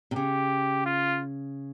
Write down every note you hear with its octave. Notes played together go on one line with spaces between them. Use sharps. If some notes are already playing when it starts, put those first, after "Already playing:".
C3
C#3 G4
F4